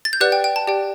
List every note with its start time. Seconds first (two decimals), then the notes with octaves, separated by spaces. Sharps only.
0.05 A6
0.13 G6
0.21 G4 B4 D5 F#5 F#6
0.32 G5
0.44 G5
0.56 A5
0.67 G4 D5 G5